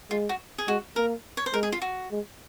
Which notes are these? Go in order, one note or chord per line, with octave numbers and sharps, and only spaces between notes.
G#3 F4
F#4
G#4
G#3 F#4
A#3 A#4
C#5
C5
G#3 A#4
G#4
F4
F#4
G#3